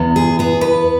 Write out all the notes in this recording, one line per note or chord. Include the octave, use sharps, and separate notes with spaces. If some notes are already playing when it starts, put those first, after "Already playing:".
Already playing: E2 B3
G#4
B3 G#4
B4